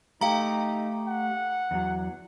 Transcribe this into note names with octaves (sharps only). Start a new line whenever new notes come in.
A3 D#4 G4 F5 A#5
F#5
E2 F#3